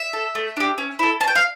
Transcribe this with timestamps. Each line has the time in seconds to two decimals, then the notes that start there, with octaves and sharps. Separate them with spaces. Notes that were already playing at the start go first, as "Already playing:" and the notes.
Already playing: E5
0.13 A4
0.35 A3
0.57 D4 G4
0.78 C#4
0.99 E4 A4
1.20 C#4 A5
1.28 G5
1.35 F5